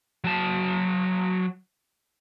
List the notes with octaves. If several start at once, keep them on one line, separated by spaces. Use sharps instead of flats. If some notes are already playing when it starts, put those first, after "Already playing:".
F#3 A5